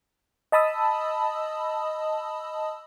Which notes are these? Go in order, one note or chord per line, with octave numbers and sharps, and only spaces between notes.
D#5 A5 B5 D#6 E6